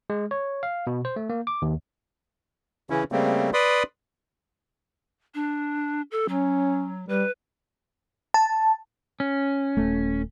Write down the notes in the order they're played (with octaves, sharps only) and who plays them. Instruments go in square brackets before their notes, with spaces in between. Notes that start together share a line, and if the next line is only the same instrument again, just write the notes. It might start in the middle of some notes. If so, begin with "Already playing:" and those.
[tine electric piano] G#3
C#5
F5
B2
C5
A3
A#3
D6
D#2
[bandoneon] C#3 E3 C#4 E4
C#3 G3 A3 A#3 C4
B4 D5 B5 C6 D#6
[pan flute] D4
A4
[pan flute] F#3 [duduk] C#4
[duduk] G3 [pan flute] B4
[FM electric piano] A5
[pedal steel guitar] C#4
[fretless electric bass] D#1 A3